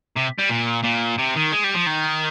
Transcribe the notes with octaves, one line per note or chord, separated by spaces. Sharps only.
C3
G3
A#2
A#2
C3
D#3
G#3
G3
F3
D#3